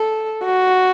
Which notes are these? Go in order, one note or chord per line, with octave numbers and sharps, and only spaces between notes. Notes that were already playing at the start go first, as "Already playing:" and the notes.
Already playing: A4
F#4